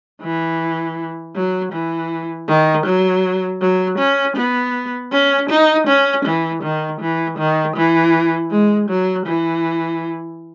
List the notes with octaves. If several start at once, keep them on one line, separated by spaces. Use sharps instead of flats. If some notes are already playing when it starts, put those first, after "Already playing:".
E3
F#3
E3
D#3
F#3
F#3
C#4
B3
C#4
D#4
C#4
E3
D#3
E3
D#3
E3
G#3
F#3
E3